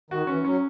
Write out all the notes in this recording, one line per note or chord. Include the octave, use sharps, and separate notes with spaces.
D#3 F#4
E3 C#4
F#3 C#4